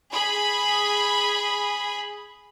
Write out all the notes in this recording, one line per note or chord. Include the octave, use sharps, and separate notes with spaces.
G#4 B5